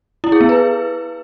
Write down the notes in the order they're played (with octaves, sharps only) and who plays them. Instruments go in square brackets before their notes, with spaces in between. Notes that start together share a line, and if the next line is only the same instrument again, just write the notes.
[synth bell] E4
G#4
B3
B4